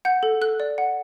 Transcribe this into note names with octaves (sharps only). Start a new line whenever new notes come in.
F#5 G6
A4
A4 F#6
D5
F#5